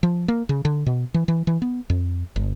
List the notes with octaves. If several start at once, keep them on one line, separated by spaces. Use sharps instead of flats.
F3
A#3
C#3
D3
B2
E3
E3
E3
B3
F2
G1